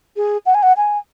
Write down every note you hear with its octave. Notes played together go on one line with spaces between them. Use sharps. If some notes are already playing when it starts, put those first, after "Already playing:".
G#4
F#5
G#5
F#5
G#5